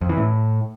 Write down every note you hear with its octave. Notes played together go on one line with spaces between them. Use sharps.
F2
E3
A2